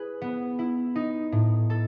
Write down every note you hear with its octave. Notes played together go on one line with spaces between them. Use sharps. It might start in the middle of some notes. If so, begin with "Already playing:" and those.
Already playing: E4 G#4 B4
B3
E4
D#4
A2
A4